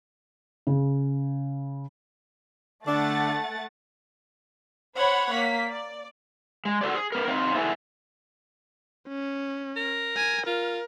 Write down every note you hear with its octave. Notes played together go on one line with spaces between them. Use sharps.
C#3
D3 A3 D4 F#5 A6
C5 C#5 F#5 B5
A#3 B6
D5
G#3
F#4 A4 C5 D5
G#4
B3 A#4
C4 D#4 C5 C#5 F5
A3 B3 E4 F#4 G#4 A4
C#4
A#4
G#5
F4 A#4